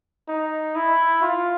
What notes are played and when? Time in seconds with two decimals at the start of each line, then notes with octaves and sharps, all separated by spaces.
0.29 D#4
0.75 E4
1.23 F4